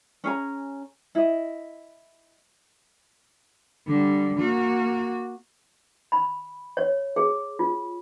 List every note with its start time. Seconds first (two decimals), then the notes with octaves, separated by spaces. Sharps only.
0.24 C#4 G#4 A#5
1.15 E4 D#5
3.87 D3 G3
4.37 A#3 F#4
6.12 B5
6.77 C#5
7.16 G#4
7.59 F4